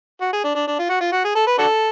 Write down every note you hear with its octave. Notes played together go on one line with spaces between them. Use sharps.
F#4
G#4
D4
D4
D4
F4
F#4
F4
F#4
G#4
A4
B4
D4 F#4 A4